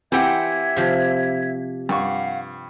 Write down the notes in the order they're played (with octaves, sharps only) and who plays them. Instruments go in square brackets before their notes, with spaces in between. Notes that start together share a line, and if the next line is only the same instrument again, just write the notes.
[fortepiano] E3 [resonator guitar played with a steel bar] C4 G4 F#5 [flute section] E5 G#6
[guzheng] C3 F3
[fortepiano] G2 C#6 [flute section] F5 F#5